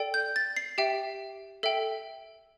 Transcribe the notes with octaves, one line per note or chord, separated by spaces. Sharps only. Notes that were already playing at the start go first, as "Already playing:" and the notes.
Already playing: A4 D5 G5
G6
A6
C7
G4 E5 G5
A4 E5 G5